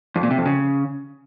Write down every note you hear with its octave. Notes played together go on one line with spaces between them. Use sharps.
F2
A#2
C3
F2
C#3